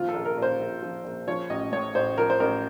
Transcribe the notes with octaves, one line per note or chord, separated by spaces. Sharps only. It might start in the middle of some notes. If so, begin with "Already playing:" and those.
Already playing: D#2 F3 F4
A4
A#1
A#4
A#2
C5
A#1
F3
A#1
F3 C#5
A1 D#5
A2 C#5
A1 C5
F3 A#4
C5
A1 A#4